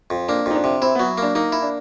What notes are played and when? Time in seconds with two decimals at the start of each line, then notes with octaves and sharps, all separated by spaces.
0.10 F2
0.28 A#3 D4
0.46 F2 D#4
0.55 D4
0.64 C3
0.81 C4 E4
0.95 F#3 B3
1.18 A#3 D4
1.35 A#3 D#4
1.52 E4
1.62 D4